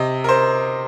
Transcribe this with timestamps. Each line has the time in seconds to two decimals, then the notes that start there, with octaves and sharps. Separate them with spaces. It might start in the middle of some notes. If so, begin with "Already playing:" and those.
Already playing: C3 D#5
0.24 A#4
0.29 C5